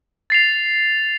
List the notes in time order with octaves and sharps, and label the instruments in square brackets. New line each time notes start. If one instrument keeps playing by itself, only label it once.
[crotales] A6 C7 F7